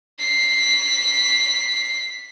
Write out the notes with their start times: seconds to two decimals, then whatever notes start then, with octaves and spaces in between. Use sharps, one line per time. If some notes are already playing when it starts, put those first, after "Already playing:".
0.19 B6 C7